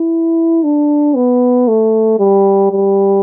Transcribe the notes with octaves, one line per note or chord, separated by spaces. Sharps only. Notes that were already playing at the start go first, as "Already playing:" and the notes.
Already playing: E4
D4
B3
A3
G3
G3